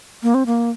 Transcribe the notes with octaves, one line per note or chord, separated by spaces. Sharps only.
A#3
C4
A#3